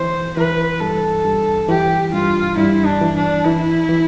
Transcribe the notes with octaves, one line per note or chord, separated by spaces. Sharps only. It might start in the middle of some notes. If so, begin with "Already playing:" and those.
Already playing: E3 C5
E3 B4
G2 A4
G2
E3 G4
G2 F4
G2 E4
D4
E3
D4
E3 E4
E3